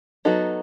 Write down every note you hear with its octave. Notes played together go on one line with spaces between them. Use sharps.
F#3 B3 D#4 F#4 A4